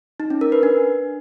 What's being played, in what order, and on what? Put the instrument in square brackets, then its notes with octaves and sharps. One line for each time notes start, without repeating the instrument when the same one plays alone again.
[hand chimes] D#4
C#4
A#4
B4
D4